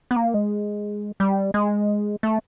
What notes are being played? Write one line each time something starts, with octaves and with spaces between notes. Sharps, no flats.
B3
A#3
G#3
G3
G#3
A3